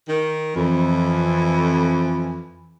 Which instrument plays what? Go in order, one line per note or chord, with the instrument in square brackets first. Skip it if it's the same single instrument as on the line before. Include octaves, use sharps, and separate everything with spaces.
[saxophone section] D#3
[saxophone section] F2 [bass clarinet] E3